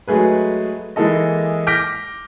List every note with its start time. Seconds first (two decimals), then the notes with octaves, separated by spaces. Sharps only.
0.08 F#3 G#3 A3 G#4 B4
0.96 E3 G#3 A#3 E4 A4 D#5
1.67 D6 F6 G6 A#6 B6 D7